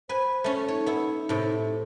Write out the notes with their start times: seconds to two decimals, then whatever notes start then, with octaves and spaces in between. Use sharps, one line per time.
0.09 B4 C5 G#5
0.44 A3 C#4
0.68 D#4 C#5
0.86 B3 E4
1.29 A2 C3